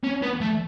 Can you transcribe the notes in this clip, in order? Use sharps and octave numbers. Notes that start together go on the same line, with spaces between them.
C#4
B3
A3